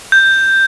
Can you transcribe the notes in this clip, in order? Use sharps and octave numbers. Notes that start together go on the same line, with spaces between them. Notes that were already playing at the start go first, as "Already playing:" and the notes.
G6